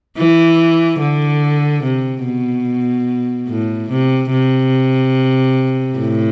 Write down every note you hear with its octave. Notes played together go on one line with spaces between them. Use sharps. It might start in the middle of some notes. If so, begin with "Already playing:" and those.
E3
D3
C3
B2
A2
C3
C3
A2